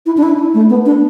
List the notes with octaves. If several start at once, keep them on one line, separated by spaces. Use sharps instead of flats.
E4
D4
E4
A3
B3
D4